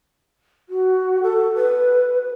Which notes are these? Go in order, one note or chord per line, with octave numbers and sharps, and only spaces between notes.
F#4
A4
B4